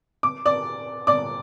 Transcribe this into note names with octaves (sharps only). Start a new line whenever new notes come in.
D6
D5 D6
D5 D6